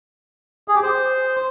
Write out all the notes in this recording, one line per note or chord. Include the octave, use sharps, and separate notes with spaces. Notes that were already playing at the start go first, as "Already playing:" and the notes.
G#4
G4
C5